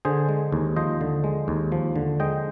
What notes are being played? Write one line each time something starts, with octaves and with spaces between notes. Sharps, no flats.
D3 G#4 C5
G#3
D#2
F3 C5 D#5
D3
G#3
D#2
F3
D3
G#3 D#5 G5